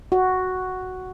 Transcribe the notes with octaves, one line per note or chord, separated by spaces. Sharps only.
F#4